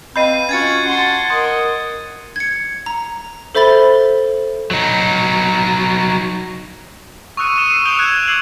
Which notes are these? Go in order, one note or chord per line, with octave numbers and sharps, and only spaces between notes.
C4 B4 D#5 F5 B5 G6 C7 D#7
C#4 F4 F#4 G#6 A6 C#7
F#5 A5 C6
A#4 D#5 C6
G#6 C#7
A#5
A4 C5 E5 B5 A6 G7
F#3 D#4
C#6 D#6 E6 F#6 C#7 D#7
D#6 C#7 D#7 E7 G7
C7
D#6 E6 G6 D7 F7 G7
F#6 G#6 F7
D6 E6 G#6 C7 F#7